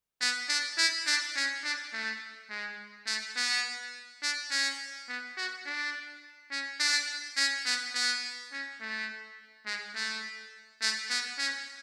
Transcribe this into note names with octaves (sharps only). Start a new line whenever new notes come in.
B3
D4
E4
D4
C#4
D4
A3
G#3
A3
B3
D4
C#4
B3
F#4
D4
C#4
D4
C#4
B3
B3
C#4
A3
G#3
A3
A3
B3
C#4